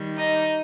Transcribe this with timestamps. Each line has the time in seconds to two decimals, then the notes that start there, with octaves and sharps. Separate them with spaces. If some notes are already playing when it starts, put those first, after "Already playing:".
Already playing: D#3 G3
0.17 D#4 D#5